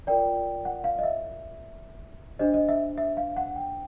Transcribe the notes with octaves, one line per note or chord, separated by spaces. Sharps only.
F4 A#4 D5 G5
F#5
F5
D#5
E5
D4 G4 C5 D#5
D#5
E5
E5
F5
F#5
G5